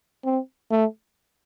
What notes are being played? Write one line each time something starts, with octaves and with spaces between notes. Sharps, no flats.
C4
A3